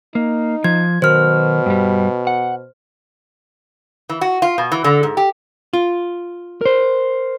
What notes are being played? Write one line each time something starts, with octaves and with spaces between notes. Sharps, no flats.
A#3 D#4
F3 G#6
B2 D#3 F#3 A#4 C5 F6
G2 G3
F#5
E3
F#4
F4
B2
E3
D3
G#2
G4
F4
A#4 C5